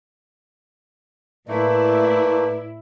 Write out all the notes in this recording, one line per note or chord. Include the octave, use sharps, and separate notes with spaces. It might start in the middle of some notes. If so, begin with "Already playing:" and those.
A2 A3 A#3 E4 B4 D5